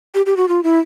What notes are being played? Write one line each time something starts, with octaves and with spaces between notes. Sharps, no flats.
G4
G4
F#4
F4
E4